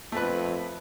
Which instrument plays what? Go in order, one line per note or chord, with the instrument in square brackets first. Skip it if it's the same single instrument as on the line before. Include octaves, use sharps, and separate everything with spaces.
[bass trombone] F2 [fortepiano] A3 B4